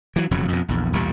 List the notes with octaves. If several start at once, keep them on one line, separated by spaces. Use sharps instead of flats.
E3 F#3
E1 F2 C#3 F#3
F2 B2
A#1 E2
B1 E2 A#2 G3